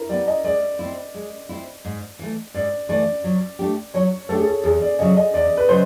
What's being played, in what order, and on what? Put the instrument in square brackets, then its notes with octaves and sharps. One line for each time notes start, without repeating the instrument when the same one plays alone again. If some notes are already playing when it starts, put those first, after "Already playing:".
Already playing: [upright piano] E4 A#4
[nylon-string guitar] G3 B3 [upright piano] D5
[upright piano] D#5
[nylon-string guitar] G#3 [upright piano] D5
[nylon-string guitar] C4 E4
G#3
C4 E4
G#2
E3 A3
[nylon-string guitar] G#2 [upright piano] D5
[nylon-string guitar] E3 A3 [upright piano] D5
[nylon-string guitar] F#3
A3 D4 G4
[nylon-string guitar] F#3 [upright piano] C#5
[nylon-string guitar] A3 D4 G4 [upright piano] A4
[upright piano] G#4
A4
[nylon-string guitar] E2 [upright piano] G#4
[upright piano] D5
[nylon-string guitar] C#3 F#3 [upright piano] D#5
[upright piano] D#5
[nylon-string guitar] E2 [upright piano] D5
[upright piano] B4
[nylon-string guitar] C#3 F#3 [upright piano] C5